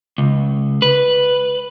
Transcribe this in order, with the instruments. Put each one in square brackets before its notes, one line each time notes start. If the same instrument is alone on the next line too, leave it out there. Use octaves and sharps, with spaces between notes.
[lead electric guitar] C#2
B4